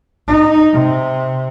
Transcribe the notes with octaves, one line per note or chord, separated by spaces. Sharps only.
D#4
C3